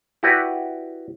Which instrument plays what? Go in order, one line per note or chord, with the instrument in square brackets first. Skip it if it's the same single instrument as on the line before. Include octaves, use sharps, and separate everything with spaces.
[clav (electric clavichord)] E4 F#4 G4 B4 D5